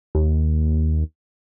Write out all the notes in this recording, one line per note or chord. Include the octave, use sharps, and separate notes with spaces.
D#2